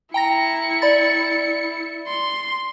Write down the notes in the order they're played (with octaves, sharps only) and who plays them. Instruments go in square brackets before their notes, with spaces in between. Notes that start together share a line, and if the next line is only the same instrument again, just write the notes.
[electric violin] E4 C#7 [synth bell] G5 A#5 A#6
[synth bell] D5 B5 A6
[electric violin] C6